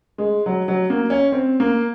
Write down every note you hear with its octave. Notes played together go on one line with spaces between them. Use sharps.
G#3
F#3
F#3
A#3
C#4
C4
A#3